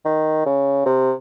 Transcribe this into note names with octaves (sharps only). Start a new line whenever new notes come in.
D#3
C#3
C3